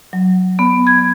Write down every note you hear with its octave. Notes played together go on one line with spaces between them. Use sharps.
F#3
B3
G#6